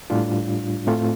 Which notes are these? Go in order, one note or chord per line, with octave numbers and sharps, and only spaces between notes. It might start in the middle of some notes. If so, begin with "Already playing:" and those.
A2 G3 D4 F4
A2 A3 C4 F4